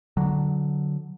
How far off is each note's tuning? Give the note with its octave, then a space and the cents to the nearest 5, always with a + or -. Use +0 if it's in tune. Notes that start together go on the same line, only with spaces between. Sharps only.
D3 -5 F#3 +0